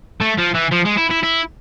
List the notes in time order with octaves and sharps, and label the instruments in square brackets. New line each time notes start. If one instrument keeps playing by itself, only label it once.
[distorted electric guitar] A3
F3
E3
F3
G#3
E4
E4
E4